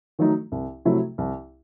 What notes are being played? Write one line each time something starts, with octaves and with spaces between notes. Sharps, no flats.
D#3 F#3 A3 D#4
C2
C3 F#3 A3 E4
C2